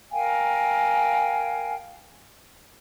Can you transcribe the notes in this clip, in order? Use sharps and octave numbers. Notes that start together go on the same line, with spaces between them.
A#4 F5 G5 G#5